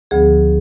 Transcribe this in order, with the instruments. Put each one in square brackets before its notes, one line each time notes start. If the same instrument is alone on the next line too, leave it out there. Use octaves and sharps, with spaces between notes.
[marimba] D2 D3 F3 B3 G#4